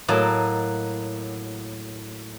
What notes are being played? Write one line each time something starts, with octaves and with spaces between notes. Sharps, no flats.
A2 F#3 A#3 D#5 A5